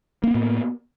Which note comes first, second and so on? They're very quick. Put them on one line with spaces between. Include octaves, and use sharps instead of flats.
A#3 C#4 B3 A2